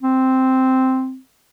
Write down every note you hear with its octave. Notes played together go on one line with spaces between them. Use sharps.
C4